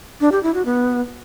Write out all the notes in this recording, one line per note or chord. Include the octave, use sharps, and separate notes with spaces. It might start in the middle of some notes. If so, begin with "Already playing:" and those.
D4
G4
E4
F#4
B3